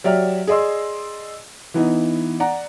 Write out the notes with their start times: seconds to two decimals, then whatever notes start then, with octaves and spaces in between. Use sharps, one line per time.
0.04 F#3 G4 D5 E5 F6
0.47 G#4 D5 D#5 C6 E6
1.74 E3 B3 D#4
2.40 D5 F#5 A#5